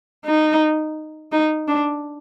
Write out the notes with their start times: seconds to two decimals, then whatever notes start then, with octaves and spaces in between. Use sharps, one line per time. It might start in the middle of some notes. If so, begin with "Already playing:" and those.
0.25 D#4
1.32 D#4
1.68 D4